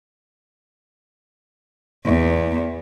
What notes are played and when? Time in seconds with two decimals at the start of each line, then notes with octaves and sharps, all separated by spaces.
2.06 E2